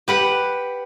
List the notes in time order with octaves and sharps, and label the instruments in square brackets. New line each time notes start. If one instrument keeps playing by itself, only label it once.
[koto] G4 B4 F#5